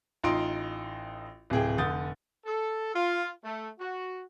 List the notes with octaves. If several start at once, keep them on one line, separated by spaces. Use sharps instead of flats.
A1 D#4 F4 C6 D7
D1 C3 G#4 G5
F1 D3 D#6 G6 A6
A4
F4
A3
F#4